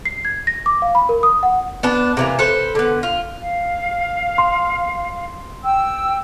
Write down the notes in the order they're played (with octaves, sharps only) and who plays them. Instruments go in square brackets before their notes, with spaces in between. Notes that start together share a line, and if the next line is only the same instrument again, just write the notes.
[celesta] C7
G#6
A#6
D6
F5
B5
A#4
D#6
F#5
[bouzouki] B3 D4 A5
C3 E3 A#3
A4 B4 C5
D3 B3
F4
[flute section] F5
[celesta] C6
[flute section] G5 E6